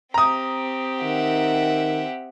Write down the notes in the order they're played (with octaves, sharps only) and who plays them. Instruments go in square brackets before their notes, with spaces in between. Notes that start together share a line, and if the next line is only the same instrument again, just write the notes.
[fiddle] C4 G4 [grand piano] A#5 D#6
[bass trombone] D#3 [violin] E5 F#5